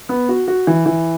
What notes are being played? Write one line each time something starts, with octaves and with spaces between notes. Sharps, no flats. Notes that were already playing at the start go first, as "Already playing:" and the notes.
B3
F#4
F#4
E3
E3